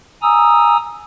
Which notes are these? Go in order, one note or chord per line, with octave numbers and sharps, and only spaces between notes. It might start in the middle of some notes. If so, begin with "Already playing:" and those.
G#5 A#5 D#6 E6